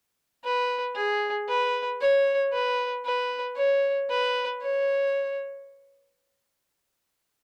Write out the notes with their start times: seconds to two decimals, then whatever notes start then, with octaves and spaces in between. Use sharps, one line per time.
0.44 B4
0.95 G#4
1.48 B4
2.01 C#5
2.52 B4
3.04 B4
3.56 C#5
4.09 B4
4.62 C#5